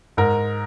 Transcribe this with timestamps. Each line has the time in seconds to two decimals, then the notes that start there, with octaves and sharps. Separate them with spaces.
0.17 G#2 A#4